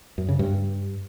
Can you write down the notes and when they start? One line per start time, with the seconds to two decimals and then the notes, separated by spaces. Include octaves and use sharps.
0.18 F#2
0.29 C#3
0.39 G2